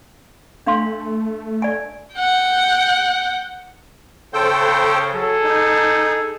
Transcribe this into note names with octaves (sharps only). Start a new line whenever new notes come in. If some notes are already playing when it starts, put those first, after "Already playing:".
A3 D4 F5 C6
D5 G#5
F#5 G5
C#3 A4 C5 G5
F#3 G#4 A4
D#4